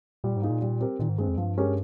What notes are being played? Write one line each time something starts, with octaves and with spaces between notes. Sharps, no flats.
A#2 G3
G#2
A#3 D#4 G#4
A#2
G3
C4 G4 A#4
A#2 D#3
G#2
G2 G#3 C4
F2
G2 F3
G#3 C#4 G4 A#4